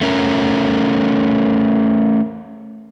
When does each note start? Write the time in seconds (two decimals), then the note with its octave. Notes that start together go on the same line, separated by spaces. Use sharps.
0.01 A3 C#4 A#4